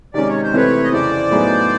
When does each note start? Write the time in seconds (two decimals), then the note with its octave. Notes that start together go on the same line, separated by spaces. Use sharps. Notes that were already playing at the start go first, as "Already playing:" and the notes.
0.14 C3 D#3 G#3 C#4 D5
0.27 C#5
0.43 C5
0.53 C3 E3 A3 C4 B4 C#5
0.83 D#5
0.92 F2 C#3 E3 C5 D5
1.31 A2 F#3 B3 D#4 G#4